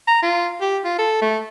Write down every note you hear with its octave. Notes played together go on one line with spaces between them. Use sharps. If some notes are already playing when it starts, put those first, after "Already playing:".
A#5
F4
G4
F4
A4
A3